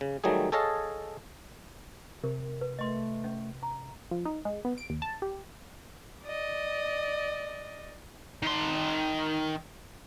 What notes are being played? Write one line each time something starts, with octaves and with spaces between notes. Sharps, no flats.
C#3
D#3 F#3 G3 A3 G#4
G#4 A4 C#5 D#5 F5 A5
C3 A#4
B4
A3 D#5 C6
C#4
A#5
F3
D#4
G#3
B3
D7
D#2
A5
G4
D5 D#5
D#3 C6